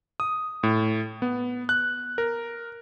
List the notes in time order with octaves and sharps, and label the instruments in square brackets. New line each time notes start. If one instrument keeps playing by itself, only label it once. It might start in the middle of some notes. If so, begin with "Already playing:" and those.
[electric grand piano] D#6
A2
B3
F#6
A#4